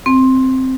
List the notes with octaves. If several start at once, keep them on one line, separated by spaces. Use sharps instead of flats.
C4